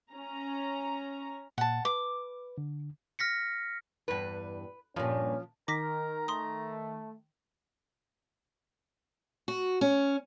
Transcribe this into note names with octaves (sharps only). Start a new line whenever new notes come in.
C#4 A#5
A#2 F#5 A5
B4 D6
D3
F6 A#6 B6 C#7
E2 G2 B4
G2 A#2 F3 C#4
D#3 A#4 A#5 D6 A#6 B6
A3 C6 D#6
F#4
C#4